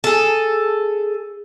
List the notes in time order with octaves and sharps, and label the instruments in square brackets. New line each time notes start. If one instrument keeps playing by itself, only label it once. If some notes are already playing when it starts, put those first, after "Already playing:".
[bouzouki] G#4 A4